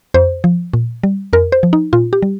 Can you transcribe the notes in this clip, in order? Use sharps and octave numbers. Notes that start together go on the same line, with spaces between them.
F2 C5
F3
A#2
G3
F2 A#4
C5
F3
D#4
A#2 F4
G4
G3